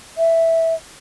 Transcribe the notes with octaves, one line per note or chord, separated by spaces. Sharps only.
E5